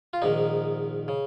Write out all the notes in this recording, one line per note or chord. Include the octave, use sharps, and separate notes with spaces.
F4
A#1 G#2 D#3 D#4
C#3